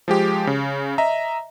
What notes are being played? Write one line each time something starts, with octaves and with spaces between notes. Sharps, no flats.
F3 G#3 G4
C#3
D#5 E5 A#5